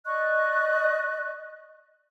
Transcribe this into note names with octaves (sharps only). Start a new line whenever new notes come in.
D5 D#5 C#6 F#6